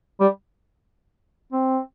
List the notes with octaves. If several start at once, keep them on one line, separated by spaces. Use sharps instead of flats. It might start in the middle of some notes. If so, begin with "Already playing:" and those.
G3
C4